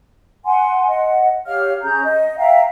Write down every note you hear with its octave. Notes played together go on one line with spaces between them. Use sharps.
F#5 G#5 C6
D#5 F#5
G4 C#5 F5 F6
C#4 G#4 A#5 G6
D#5
E5 F5 G5 A#5